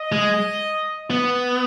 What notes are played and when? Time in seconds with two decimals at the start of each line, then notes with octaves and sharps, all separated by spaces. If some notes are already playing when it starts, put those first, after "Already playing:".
Already playing: D#5
0.12 G#3
1.10 B3